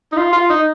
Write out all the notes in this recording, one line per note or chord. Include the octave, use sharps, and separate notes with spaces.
D#4
F4
F4
D#4